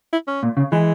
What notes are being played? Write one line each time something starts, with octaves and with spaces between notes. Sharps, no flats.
E4
C#4
A#2
C#3
E3 G#3